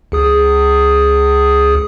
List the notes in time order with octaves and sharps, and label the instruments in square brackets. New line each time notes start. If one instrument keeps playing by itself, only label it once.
[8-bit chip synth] C#2 G#4 D#6